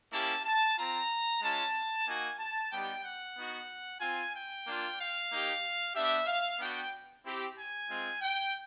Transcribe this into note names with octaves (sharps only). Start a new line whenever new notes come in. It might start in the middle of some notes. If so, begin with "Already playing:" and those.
A#3 C#4 E4 G4 A5
A5
C4 F4 A#5
G#3 C#4 F4 A5
A#3 D#4 F#4 G#5
A5
G3 B3 D#4 G4 G5
F#5
B3 D#4 F#4
C4 F4 G#5
G5
A#3 D4 F4
F5
A#3 D#4 G4
B3 D4 G4 E5
F5
B3 D4 F#4 G5
C4 E4 G4
G#5
G#3 C4 F4
G5